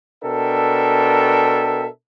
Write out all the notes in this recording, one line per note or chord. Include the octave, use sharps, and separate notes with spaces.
B2 D4 A4 A#4 E5 G5